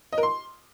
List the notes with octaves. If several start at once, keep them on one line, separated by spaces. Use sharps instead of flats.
D#5
A#4
C6